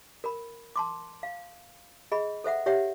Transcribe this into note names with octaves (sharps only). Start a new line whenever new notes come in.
A#4 B5
A5 C6 D6
F5
G#4 D#5 B5
A4 C5 E5 F#5
G4 C#5 E5 F#5 G5